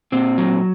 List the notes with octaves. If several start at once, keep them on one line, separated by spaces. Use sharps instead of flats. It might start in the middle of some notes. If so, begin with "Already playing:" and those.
A#2 C4
F#3